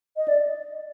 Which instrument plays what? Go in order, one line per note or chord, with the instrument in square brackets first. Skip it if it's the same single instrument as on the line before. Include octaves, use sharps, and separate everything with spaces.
[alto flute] D#5
D5